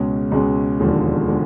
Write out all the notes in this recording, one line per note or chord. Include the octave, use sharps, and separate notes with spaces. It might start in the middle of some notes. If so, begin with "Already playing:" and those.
Already playing: C#2 B2 G#3 C#4
C#2 B2 G#3 C#4
E1 D#2 D3 F3 G#3
D3 F3 G#3